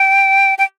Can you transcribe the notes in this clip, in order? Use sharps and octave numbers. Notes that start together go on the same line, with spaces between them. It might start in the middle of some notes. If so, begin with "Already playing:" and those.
Already playing: G5
G5